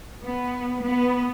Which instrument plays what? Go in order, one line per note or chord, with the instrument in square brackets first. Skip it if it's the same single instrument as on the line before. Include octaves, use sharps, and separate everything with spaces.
[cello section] B3
B3